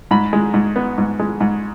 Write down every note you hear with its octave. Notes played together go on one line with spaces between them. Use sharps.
G#2 B5
G#3
G#2
B3
G#2
G#3
G#2